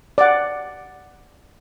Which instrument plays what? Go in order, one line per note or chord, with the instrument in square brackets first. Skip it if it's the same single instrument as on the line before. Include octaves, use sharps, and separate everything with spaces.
[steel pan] D5 F#5